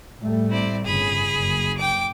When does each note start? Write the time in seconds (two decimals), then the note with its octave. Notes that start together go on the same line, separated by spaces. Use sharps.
0.19 A2 G3 A3
0.49 C4 E4 D5
0.84 G1 C#3 G#4 B5
1.30 F#1
1.77 G5 D6